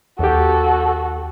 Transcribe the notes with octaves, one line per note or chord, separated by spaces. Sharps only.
D#2 F#4 G4 A4